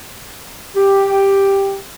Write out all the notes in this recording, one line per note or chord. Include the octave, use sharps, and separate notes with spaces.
G4